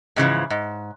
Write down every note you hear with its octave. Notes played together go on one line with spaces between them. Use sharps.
G#2 C#3 E3 F3
G#2